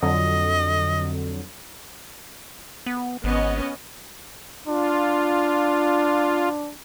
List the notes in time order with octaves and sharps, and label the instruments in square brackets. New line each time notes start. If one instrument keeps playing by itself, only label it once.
[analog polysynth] F2 D3 F#3 [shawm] D#5
[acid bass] B3
[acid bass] G#1 [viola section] B3 C#4 D#5
[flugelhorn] D4 [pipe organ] F4